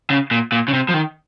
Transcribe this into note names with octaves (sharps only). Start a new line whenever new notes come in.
C#3
A#2
A#2
C#3
C3
F3
D#3